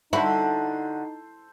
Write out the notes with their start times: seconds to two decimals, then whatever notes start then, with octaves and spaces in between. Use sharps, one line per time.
0.13 D3 D#4 E4 F#4 A4 C5